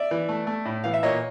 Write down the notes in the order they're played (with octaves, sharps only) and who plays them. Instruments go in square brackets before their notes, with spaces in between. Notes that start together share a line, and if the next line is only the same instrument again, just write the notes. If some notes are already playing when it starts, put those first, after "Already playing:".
Already playing: [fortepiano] D5 E5
E3
A3
A3
A2
E3 F5
E5
A#2 C#5 D#5